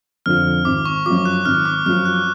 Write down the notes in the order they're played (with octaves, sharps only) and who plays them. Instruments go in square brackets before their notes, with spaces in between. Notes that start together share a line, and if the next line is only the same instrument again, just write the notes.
[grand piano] F2 D3 F3 [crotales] F6
[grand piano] G#1 [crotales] D6
[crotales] C#6
[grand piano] F#2 F3 [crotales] D6
[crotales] F#6
[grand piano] G#1 [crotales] F6
[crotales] D6
[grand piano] F#2 F3 [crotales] F6
[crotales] F#6